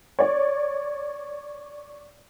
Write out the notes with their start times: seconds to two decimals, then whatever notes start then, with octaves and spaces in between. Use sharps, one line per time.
0.19 C#5 D5